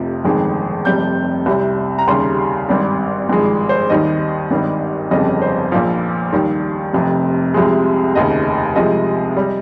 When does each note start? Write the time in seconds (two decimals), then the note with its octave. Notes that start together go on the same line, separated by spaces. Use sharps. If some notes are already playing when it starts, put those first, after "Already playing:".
Already playing: F1 F2 C3 F3
0.25 G1 F2 D#3 G#3
0.85 F1 F2 C3 G3 G6
1.46 C2 C3 G3
1.99 A#5
2.07 D#2 C#3 G3 C6
2.69 G#1 G2 G3
3.29 G#1 G2 F3 G#3
3.69 C5
3.90 D#2 D#3 G3 D#5
4.50 G#1 G2 D#3 G3
5.11 G1 F2 C#3 G3 D#5
5.42 C5
5.71 A#1 A#2 F3 F5
6.32 D#2 D#3 G3
6.93 F1 F2 C3
7.54 C2 C3 F3 G#3
8.15 F1 D#2 C#3 D#5
8.76 C2 C3 F3 G#3 D#5
9.37 G3